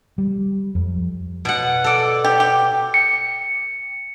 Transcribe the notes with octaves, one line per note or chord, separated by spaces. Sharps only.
G3
F2
B2 F#5
A4 D5
G4
G4
C#7